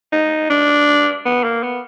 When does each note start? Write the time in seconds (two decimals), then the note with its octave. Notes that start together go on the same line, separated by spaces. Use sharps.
0.12 D#4
0.50 D4
1.25 B3
1.44 A#3
1.63 B3